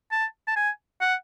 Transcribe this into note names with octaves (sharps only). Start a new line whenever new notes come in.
A5
A5
G#5
F#5